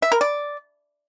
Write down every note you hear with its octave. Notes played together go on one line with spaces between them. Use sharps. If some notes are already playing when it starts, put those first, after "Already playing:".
E5
A#4
D5